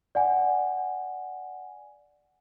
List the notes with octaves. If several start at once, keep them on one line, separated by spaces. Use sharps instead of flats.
D5 F#5 G#5